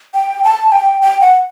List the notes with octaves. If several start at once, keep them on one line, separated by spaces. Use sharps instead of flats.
G5
A5
G5
G5
F#5